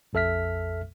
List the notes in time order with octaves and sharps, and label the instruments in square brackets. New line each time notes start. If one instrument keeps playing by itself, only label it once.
[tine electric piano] A#1 F2 A4 E5 F6 B6